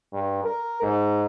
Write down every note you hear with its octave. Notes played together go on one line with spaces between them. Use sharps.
G2
A#4
G#2